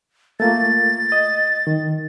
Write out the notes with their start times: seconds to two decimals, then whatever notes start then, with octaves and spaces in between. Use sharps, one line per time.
0.40 A3 A#3 F4 A6
1.12 D#5
1.67 D#3